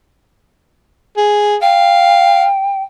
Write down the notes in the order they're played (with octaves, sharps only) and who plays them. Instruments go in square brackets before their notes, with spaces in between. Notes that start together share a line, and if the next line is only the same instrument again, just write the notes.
[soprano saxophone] G#4
[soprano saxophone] F5 [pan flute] G5